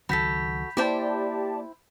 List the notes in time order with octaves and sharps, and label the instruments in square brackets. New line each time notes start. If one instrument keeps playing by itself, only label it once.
[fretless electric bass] C#2 D#3 F#3 [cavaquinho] F#4 A4 [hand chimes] B5 G6 B6
[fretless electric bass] A#3 [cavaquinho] E4 C5 G5 [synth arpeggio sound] G4 D5 A5